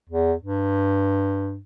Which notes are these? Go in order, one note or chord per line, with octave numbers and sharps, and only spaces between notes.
E2
G2